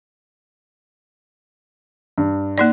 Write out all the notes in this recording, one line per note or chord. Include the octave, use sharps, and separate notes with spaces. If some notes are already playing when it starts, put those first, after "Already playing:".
G2
A#3 D#4 D5